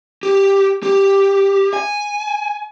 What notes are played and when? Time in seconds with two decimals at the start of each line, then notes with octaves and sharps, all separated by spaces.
0.23 G4
0.83 G4
1.73 G#5